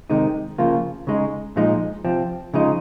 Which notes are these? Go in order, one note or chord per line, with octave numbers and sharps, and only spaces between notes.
C3 D#3 G#3 D#4
C#3 F3 A#3 F4
C#3 G#3 D#4
A#2 F3 G#3 D#4
C3 F3 C4
C#3 F3 G#3 D#4